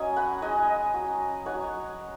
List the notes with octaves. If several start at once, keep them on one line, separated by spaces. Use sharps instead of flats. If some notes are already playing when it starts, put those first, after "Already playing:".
Already playing: F#3 C#4 D#5 G#5
F#5 B5
G#3 D#4 D#5 G#5
F#3 C#4
F#3 D#4 C#5 F#5